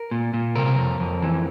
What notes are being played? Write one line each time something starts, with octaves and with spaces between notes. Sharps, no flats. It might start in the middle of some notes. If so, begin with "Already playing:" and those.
Already playing: A#4
A#2
A#2
C3 A#4
F2
F2
E3